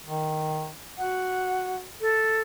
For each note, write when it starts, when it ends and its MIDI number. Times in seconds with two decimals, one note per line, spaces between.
0.05 0.70 51
0.98 1.86 66
0.98 1.76 78
2.01 2.42 69